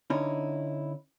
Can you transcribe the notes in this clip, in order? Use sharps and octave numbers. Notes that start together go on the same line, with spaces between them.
D3 C#4 D#4 E4